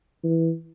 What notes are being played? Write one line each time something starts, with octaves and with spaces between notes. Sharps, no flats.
E3